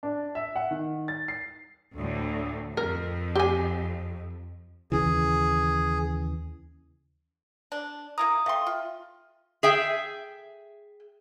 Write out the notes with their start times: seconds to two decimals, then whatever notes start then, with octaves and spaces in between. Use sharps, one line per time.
0.03 D4
0.35 E5
0.56 F#5
0.71 D#3
1.08 A6
1.28 C7
1.97 D2 A2
2.77 F2 A#4
3.35 G4 G#5
4.92 D#2 C#3 E3 G#4
7.72 D4
8.18 A#3 E4 A#5 D#6
8.46 A3 E5 F5 G5 C6
8.67 F4
9.63 G#4 E5 G5